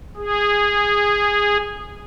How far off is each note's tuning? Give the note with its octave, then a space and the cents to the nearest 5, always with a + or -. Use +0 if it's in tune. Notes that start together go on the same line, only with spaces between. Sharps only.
G#4 -15